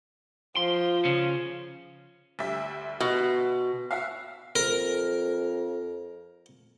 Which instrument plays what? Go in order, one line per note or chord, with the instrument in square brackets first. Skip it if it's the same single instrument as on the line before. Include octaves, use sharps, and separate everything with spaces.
[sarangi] F3 [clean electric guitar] C6
[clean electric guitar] C#3 C#4
[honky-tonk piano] D2 G3 E5
[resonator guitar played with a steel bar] B2
[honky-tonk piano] F#4 E5 F5
[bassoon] F2 [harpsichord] A#4